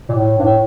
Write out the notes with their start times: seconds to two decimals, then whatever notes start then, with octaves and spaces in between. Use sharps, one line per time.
0.09 A#2
0.14 A2
0.38 G2
0.44 A2